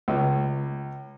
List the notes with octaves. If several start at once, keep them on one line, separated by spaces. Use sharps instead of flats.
C#2